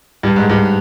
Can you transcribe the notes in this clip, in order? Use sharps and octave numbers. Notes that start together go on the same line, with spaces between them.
G2
G#2
G2